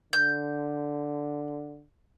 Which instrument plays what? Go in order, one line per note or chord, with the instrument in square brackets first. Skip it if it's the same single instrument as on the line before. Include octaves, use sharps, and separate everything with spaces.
[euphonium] D3 [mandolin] G6